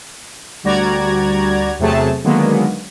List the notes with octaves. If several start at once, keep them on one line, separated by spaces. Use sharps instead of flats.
D2 G3 F#4 D5 A#5 G#6
E2 C3 F#3 A3 G#4 A5
D3 D#3 F#3 G#3 A#3 B3